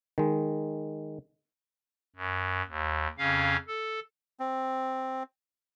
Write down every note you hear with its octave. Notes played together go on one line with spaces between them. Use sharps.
D#3 G#3
F#2
D#2
F2 C#3 C#4 F5
A4
C4